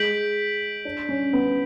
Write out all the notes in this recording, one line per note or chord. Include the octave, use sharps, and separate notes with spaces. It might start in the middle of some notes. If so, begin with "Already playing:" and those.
Already playing: G#3 G6 B6 D7 F#7
D4
C#4
B3